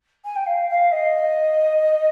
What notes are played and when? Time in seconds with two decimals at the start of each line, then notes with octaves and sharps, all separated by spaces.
0.24 G#5
0.35 G5
0.46 F5
0.69 F5
0.91 D#5